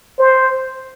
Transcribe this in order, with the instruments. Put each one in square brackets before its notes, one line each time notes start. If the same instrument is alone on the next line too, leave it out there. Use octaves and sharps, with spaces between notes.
[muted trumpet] C5